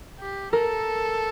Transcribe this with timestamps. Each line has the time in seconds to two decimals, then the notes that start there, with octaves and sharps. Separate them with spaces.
0.20 G4
0.53 A4 A#4